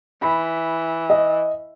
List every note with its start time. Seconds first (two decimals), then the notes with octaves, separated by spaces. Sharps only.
0.22 E3 B5
1.10 D#5